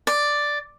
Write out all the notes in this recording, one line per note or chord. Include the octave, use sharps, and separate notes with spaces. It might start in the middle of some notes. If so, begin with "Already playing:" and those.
D5